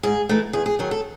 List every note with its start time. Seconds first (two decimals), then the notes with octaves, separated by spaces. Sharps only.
0.03 G#2 G#4
0.29 E3 A3 D#4
0.53 E2 G#4
0.66 G#4
0.79 D#3 F#3 G#4
0.91 A4